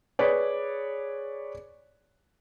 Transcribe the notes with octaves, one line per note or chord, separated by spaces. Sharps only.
G#4 B4 C#5 D5